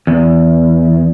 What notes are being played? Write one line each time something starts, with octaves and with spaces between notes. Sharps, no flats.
E2